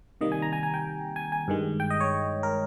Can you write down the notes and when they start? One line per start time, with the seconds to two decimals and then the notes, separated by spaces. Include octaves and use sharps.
0.21 C3 D#3 G3 A#3 D#5
0.32 G#5
0.42 A#5
0.53 G#5
0.63 G#5
0.74 G5
1.16 G#5
1.32 G#5
1.48 G2 D#3 G#3
1.80 G5
1.90 D#5
2.00 C#5
2.43 A#4